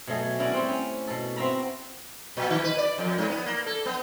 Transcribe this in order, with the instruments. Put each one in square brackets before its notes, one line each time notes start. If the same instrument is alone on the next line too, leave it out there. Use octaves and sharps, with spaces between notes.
[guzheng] B2 F#3 A3 G#4
C#4 E4 F#4 D5
G3 C4
C#4
B2 A4
C4 F#4 E5 A#5 B5
[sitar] A#2
D#3
B4
D5
F2
G#2
B3
A#3
A4
B3